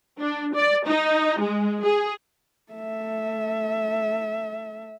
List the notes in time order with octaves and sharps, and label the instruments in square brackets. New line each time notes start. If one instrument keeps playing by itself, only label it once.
[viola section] D4
D5
D#4
G#3
G#4
[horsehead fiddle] A3 E5